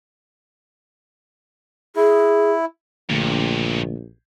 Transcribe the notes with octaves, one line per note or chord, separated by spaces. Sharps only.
E4 G#4
A#1 G2 A#2 D3 A3